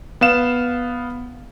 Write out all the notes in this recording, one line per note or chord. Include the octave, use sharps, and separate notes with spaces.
B3 F5 E7